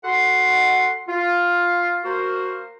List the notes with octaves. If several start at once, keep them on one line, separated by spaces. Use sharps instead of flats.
F#4 A4 F#5 C6
F4
A#3 F#4 A#4 C5